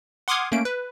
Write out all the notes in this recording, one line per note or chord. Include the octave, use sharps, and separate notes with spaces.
F#5 C6 D6 D#6 F6 G#6
A3 A#3 C#4 D7
B4